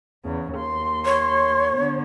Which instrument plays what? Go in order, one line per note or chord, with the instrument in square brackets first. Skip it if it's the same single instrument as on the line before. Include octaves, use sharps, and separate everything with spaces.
[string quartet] E2 C#3
D#2 C6
[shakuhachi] C#5
[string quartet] D3 B3